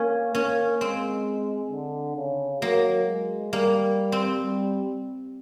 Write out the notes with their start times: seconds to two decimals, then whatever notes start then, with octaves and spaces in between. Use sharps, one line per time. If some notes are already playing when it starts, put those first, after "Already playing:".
Already playing: A#3 C#4
0.35 A#3 C#4
0.80 G#3 C4
1.71 D3
2.16 C#3
2.61 F#3 A#3
3.07 G#3
3.52 G3 A#3
4.12 C4
4.43 G3